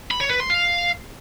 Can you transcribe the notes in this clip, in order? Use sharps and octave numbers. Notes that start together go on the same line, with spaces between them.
B5
C#5
B4
C6
F5